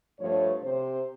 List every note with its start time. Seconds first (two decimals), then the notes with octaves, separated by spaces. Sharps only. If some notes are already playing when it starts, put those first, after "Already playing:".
0.20 G2 F3 A3 C#5
0.62 C3 C5